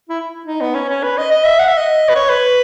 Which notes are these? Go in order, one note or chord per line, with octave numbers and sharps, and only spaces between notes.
E4
D#4
B3
C#4
C#4
B4
D#5
D#5
E5
F#5
E5
D#5
B4
C#5
B4